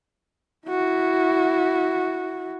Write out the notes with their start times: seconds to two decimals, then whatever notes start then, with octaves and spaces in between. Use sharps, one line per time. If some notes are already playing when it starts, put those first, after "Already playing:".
0.67 E4 F#4